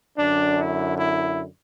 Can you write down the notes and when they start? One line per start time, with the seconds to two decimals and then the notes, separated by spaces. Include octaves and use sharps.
0.16 F#2 D3 D4
0.58 E4
0.97 E4